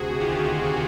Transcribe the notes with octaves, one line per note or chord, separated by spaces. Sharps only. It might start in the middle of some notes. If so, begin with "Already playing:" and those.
Already playing: D2 C3 F#4 G#4
D#3 F4 G4
D#3